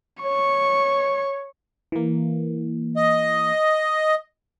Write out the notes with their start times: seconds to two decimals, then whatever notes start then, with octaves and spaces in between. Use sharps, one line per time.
0.23 C#5 C#6
1.92 E3 A#3
2.96 D#5